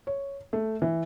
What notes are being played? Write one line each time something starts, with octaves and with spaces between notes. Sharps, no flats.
C#5
A3
E3